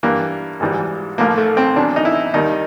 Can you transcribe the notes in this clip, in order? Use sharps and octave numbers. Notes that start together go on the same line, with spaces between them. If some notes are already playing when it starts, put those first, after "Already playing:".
G2 E3 G3 A#3
G#1 G#2 E3 G3
A1 A2 F3 A#3
A3
C4
E2 B2 F#3 D4
D#4
E4
D#2 D#3 G3 D#4